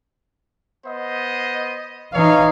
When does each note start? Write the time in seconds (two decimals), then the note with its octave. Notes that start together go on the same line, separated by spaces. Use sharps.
0.85 B3 C5 D#5
2.13 E3 D#4 C#5 F5